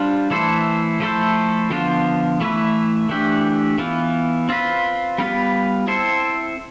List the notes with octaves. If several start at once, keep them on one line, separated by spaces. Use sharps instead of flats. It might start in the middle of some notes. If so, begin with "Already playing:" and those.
Already playing: G3 D4 F4 C5
E3 A3 E4 A4 C5
F3 A3 E4 A4 C5
D3 F3 B3 F4 C5
E3 A3 E4 B4
E3 A3 D4 G4
E3 B3 F4
C4 F4 B4
G3 B3 F4 B4
C4 E4 A4 C5